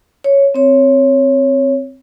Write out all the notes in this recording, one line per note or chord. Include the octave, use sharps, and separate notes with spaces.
C#5
C4 C#5